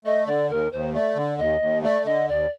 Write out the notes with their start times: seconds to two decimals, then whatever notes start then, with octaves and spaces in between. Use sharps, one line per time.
0.05 A3 D#5
0.26 D3 D5
0.50 D#2 A#4
0.72 D#2 C5
0.93 A3 D5
1.16 D3
1.38 D#2 D#5
1.61 D#2
1.83 A3 D5
2.05 D3 D#5
2.28 D#2 D5